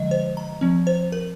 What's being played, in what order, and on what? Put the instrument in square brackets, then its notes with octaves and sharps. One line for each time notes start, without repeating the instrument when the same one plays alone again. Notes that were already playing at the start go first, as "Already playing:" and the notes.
Already playing: [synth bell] D3 F3 G#3 D#5
C5
A#5
F3 C4
C5
A#4